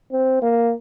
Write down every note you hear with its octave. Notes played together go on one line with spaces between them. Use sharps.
C4
A#3